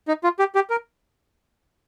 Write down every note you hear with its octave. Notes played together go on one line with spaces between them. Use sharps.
D#4
F4
G4
G4
A#4